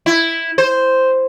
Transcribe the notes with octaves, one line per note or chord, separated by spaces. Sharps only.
E4
C5